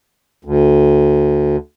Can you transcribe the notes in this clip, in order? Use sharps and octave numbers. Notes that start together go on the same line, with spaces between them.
D2